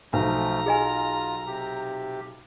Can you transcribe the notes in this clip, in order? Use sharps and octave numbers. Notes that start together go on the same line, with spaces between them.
B1 F3 A3 A#5
F4 G#4 D#5 G#5
C3 G4